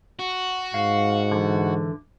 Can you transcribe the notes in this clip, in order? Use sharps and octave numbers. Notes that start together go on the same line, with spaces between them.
F#4
G#2 F5
D3 E3